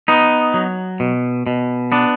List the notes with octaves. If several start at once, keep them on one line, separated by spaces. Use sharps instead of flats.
B3 D#4
F#3
B2
B2
B3 D4